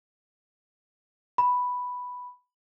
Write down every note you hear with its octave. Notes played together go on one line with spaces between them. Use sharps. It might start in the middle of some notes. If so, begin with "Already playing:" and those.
B5